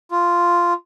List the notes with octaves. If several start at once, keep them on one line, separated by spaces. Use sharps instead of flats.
F4